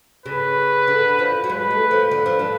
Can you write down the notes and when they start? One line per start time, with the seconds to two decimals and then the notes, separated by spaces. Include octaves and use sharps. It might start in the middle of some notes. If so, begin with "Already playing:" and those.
0.26 C#3 B4
0.87 D3
1.19 F3
1.44 F#3
1.50 G#3 B4
1.71 A3
1.91 F3
2.11 D3 B4
2.26 F3
2.39 D3